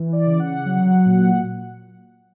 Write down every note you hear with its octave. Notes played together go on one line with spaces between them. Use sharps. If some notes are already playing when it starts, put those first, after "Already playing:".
Already playing: E3
D5
C#3
F#5
F#3
A#2